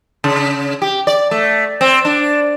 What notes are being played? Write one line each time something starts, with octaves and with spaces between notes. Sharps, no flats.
C#3
G4
D5
A3
C4
D4